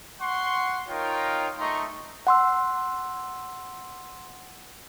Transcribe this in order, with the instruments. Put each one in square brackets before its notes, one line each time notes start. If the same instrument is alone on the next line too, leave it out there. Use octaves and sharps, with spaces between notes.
[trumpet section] F#5 C6 C#6
D#4 F4 A#4 C#5 G5 A#5
A3 D#4 D#5 A#5 C6 C#6
[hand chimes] F#5 C6 E6